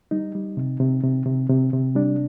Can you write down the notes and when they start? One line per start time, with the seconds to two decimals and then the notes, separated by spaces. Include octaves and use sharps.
0.11 G3 D#4
0.35 G3
0.57 C3
0.80 C3
1.03 C3
1.26 C3
1.50 C3
1.73 C3
1.95 G3 D4